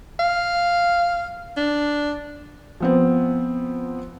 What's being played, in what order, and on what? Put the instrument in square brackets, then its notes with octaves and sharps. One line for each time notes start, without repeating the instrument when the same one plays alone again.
[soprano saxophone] F5
D4
[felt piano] F3 B3 C4